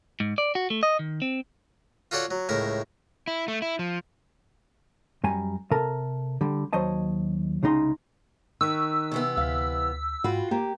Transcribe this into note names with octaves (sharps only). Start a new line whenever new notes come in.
G#2
D5
F#4
A3
D#5
D#3
C4
F4 F#4 A4 C#5 D5 F#5
F#3
C#2 A2 A#4 E5
E4
A3
E4
F3
F#2 G3 G#5 A#5
C3 A4 A#4 A5
D3 G3
D#2 F#3 C5 C#5 D#5 A5
C2 C#3 G#3 D#4 C6
D#3 C#6 E6 F#6 B6
C3 E3 B3
D2 F5 B6
G#2 F4 F#4 F#5 G5 B5
A#3 G4 G5